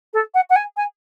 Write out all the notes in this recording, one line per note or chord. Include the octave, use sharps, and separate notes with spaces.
A4
F#5
F#5
G#5
G#5